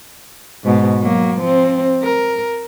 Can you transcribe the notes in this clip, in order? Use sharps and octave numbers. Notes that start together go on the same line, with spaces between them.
G#2 B2
F#3 A#3
F3 C4
A#4